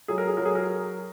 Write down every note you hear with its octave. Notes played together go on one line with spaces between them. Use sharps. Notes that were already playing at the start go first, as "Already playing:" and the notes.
F#3 G#4
A#4
G#4
F#3 A#4
G#4
A#4